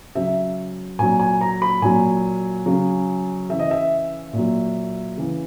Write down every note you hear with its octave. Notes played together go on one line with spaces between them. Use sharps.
C#3 F#3 E5
A#2 F#3 G#5
G#5
A#5
B5
A#2 F#3 G#5
C#3 F#3
C#3 E3 E5
D#5
E5
A#2
F#3
C#3 E3